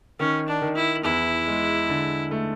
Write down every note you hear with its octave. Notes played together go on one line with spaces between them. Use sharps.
D#3 C#4
D4
D#3
E4
E2 E4
G#3
D3
A3